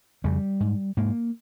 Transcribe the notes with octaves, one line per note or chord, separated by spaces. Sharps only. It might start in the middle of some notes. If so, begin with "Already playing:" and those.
F2 C#3 G3
G#2
G#2 A#3